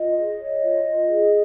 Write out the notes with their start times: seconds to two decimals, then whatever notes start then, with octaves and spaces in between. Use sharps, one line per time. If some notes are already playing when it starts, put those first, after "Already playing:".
Already playing: F4 D#5
0.15 G#4
0.39 C#5
0.62 F4
0.84 F4
1.07 G#4